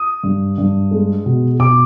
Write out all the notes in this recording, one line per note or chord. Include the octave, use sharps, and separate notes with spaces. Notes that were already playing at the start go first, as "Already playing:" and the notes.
Already playing: D#6
G2
G2
G#3
B2
B2 D6